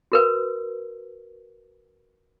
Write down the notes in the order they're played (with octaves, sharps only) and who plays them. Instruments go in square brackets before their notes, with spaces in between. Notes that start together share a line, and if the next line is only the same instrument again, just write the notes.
[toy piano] F#4 A#4 B4